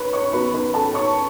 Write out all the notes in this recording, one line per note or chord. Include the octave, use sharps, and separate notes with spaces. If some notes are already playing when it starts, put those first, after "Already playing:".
Already playing: B4 C#5 B5 C#6
C#5 C#6
E2 D#3 F#3 B4 B5
B4 B5
A4 A5
C#5 C#6